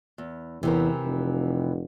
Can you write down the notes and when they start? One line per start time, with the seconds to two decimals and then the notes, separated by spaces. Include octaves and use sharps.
0.18 E2
0.63 E2 C3 E3 A#4
1.03 F1